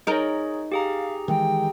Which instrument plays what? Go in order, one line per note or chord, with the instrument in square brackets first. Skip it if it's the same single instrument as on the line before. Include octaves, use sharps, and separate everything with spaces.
[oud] D#4 A#4 [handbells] G#4 C#5
[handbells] G4 G#4 A#5 [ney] F5
[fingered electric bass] D#3 E3 G#3 [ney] G5